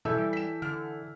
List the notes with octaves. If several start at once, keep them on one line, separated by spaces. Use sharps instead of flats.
B2 E3 A4 E5 E6 G6
G3
B6 E7
D3 F6